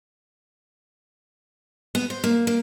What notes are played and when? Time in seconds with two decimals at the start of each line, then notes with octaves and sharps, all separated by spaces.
1.95 B3
2.10 C5
2.24 A#3
2.47 A#3